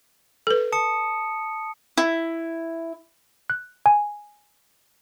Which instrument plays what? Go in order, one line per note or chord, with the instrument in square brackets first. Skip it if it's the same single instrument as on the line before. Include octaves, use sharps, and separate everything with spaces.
[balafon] A4 B4
[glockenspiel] A5 D#6 C#7
[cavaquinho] E4
[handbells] F#6
G#5